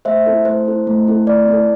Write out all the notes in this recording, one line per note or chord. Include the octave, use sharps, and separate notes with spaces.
A3 C5 E5
C4 E4 A4
A3 C5
C4 E4 A4
A3
C4 E4 A4
A3 D5
C4 E4 A4